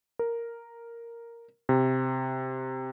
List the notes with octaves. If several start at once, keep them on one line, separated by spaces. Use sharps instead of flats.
A#4
C3